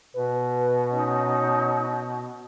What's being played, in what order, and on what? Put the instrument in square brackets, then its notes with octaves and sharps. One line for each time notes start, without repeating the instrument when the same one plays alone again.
[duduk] B2 [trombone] B4
[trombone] C#4 [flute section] D#4 D#5